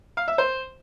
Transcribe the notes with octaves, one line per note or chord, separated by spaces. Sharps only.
F5
E5
C5